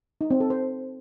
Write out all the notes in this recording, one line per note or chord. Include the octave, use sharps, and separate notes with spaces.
D#4
C4
A4
C5